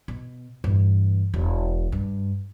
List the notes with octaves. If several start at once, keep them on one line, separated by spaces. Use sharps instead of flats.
B2
G2 E3
E1
G2